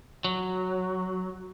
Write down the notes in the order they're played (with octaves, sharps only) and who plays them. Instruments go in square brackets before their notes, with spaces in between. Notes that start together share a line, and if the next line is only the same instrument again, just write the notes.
[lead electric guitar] F#3